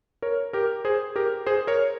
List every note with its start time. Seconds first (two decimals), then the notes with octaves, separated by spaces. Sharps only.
0.22 A#4 C#5
0.53 G4 A#4
0.85 G#4 C5
1.16 G4 A#4
1.46 G#4 C5
1.67 A#4 C#5